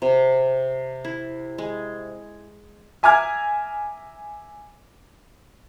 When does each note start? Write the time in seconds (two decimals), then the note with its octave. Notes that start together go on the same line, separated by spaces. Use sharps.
0.02 C3
1.05 E4
1.58 G#3
3.03 E5 G#5 A#5 D6 F6 G#6